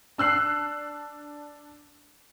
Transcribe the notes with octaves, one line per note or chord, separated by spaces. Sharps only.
D4 E6 F#6 C7